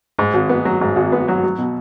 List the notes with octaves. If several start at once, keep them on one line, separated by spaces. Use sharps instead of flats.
G#2
G#1
B3
F#3
G#2
G#1
B3
F#3
F#3
B2